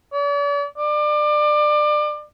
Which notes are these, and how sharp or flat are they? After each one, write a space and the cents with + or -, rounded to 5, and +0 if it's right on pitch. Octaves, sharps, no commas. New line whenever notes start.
D5 -45
D5 +30